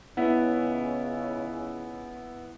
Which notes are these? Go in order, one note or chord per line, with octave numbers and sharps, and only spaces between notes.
C#2 C#3 B3 C#4 E4